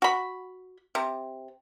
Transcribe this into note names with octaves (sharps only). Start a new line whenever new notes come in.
F#4 B5
C3